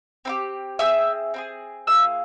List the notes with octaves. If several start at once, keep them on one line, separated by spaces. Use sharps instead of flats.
C4 E4 G4
C4 E4 G#4 E5 E6
C4 E4 G#4
A#3 F4 G#4 E5 E6